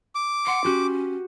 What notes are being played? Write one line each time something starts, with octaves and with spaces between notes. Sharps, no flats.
D6
F#5 C6
C#4 F#4 G4